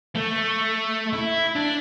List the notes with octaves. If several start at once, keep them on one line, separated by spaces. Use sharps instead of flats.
A3
E4
D4